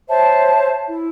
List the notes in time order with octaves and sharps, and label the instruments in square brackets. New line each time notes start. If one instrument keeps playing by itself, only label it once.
[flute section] C5 C#5 E5 A5
E4